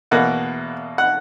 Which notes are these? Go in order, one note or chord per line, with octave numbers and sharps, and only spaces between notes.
E2 B2 A#3 F#5
F#5